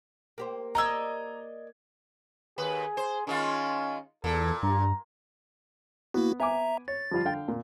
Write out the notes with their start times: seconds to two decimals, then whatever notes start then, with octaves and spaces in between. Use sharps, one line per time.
0.38 A#3 G4 C5
0.75 D5 D#5 A#5 E6 G#6
2.58 D#2 G#4 B4
2.97 C5
3.27 D#3 G#3 C#4 F4
4.24 E2 A#2 A4
4.63 G2 A#5
6.14 A#3 B3 E4 F#4
6.40 B3 E5 G#5 A#5 D6
6.88 C#5 A6
7.11 F3 G3 F4
7.25 D3 F5 G5
7.48 A#2